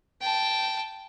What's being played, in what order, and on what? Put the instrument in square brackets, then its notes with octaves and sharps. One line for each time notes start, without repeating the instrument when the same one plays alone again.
[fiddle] G5 A5